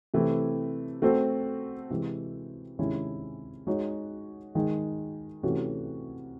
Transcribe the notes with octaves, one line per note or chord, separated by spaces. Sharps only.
C3 E3 A3 C4 E4
A3 C4 F#4 A4 C5
C3 E3 G#3
C3 D#3 G#3 C#4 E4
G#3 D#4 F#4 C#5
D#3 G#3 D#4
C3 E3 A3 C#4 F#4